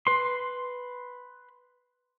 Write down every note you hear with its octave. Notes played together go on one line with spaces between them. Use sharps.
B4 C6